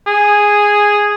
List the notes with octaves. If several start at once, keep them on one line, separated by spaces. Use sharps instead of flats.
G#4